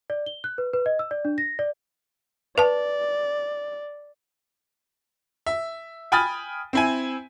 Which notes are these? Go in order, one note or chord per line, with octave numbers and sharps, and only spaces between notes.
D5
G7
F#6
B4
B4
D#5
E6
D5
D4
A#6
D5
B4 D5 A5
E5
G5 G#5 B5 D#6 F6 A6
C4 E4 G#5